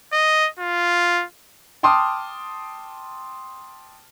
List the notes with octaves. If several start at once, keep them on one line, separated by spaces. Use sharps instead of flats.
D#5
F4
G5 A5 C6 D6 D#6 F6